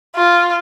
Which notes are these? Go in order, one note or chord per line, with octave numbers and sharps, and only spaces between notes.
F4